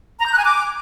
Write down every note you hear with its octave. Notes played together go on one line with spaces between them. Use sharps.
A#5
G6
F#6
G#5
D6